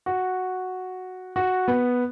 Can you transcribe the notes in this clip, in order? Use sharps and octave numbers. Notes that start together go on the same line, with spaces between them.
F#4
F#4
B3